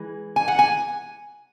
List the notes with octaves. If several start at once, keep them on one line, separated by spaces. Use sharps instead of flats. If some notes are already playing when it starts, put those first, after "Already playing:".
Already playing: E3 G#3
G#5
F#5
G#5